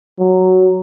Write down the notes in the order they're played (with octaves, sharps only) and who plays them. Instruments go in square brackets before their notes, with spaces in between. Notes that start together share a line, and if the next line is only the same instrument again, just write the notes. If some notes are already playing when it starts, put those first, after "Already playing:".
[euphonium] F#3